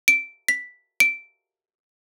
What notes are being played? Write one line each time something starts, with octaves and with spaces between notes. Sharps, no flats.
D7
B6
D7